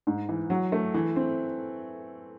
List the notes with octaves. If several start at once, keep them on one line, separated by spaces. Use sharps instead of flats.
G#2
E3
F#3
A3
E3
C4